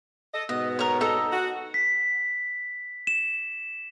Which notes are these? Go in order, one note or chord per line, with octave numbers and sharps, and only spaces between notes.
A4 D#5
G#2 B2 B3 D#5
A#4 C#5
D#4 A4 D#5
F#4
B6
E7